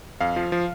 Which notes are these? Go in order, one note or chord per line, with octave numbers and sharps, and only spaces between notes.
F2 F5
F3
F3